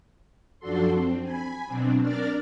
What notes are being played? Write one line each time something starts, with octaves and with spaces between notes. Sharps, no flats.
F#2 F3 D4 F#4 A4 C6
C4
G#5 B5
B2 F#3 C4 D4
D4 A#4 D5 F6 A6